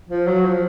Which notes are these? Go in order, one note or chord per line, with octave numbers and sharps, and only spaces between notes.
F3
F#3
F3